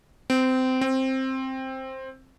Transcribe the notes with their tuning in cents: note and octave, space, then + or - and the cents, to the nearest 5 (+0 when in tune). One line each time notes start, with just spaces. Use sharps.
C4 -20
C4 +10